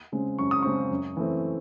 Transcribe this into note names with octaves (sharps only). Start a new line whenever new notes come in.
C#3 G#3 C4
F#2 C#6
D#6
C#3 G#3 C4 C#6
F#2
E3 A3 C4